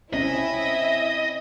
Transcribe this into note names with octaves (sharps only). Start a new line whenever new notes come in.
C4 C#4 E4 D#5 E5